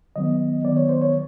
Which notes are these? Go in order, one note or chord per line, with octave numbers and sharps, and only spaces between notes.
D#3 F#3 B3 D#5
D#3 F#3 B3 D5
C#5
C5
C#5